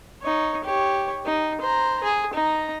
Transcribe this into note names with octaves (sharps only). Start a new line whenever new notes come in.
D#4 C#5
G4 C#5
D#4
C5 A#5
G#4
D#4 A#5